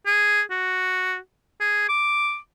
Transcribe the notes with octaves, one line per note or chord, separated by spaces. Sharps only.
G#4
F#4
G#4
D6